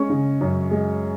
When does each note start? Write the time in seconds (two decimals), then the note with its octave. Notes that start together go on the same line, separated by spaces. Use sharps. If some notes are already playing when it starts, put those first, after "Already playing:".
Already playing: G#3 C#4 C#6
0.09 C#3
0.41 F#2
0.71 G#3